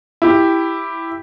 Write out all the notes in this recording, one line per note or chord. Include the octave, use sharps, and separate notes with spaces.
E4 G4